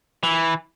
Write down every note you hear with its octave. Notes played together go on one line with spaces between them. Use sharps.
E3